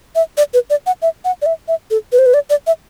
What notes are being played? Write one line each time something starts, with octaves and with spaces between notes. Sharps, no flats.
E5
D5
B4
D5
F#5
E5
F#5
D5
E5
E5
A4
B4
C5
B4
D5
D5
E5